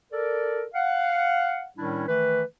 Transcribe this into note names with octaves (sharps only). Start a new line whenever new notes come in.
A4 A#4 D5
F5 F#5
A2 D#3 G3 C#4 D4 E4
D#3 E3 A3 B4